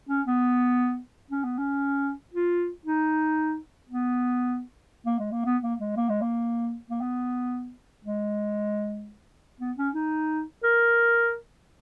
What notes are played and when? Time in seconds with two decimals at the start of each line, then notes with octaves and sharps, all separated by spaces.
0.09 C#4
0.27 B3
1.31 C#4
1.44 B3
1.58 C#4
2.34 F4
2.85 D#4
3.89 B3
5.06 A#3
5.19 G#3
5.32 A#3
5.45 B3
5.63 A#3
5.80 G#3
5.97 A#3
6.09 G#3
6.21 A#3
6.90 A#3
7.01 B3
8.05 G#3
9.60 B3
9.77 C#4
9.94 D#4
10.63 A#4